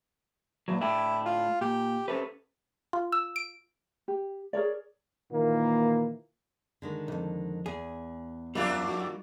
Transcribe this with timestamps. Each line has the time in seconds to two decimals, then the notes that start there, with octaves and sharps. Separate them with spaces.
0.68 E2 A#2 F#3
0.81 A2 D4 E4 G5
1.26 F4
1.61 A#2 G4
2.08 C3 C#4 A4 B4
2.93 F4
3.12 E6
3.36 D7
4.08 G4
4.53 G#4 A#4 C#5 D5
5.32 A#2 D#3 E3 A#3
6.82 D3 D#3 G#3
7.08 B1 F2
7.66 E2 G#4
8.55 F2 G3 A#3 D4 F4 G4
8.88 A3 D#4 F#4